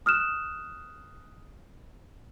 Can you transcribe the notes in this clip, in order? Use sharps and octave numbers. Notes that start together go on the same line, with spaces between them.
D#6 F6 F#6 E7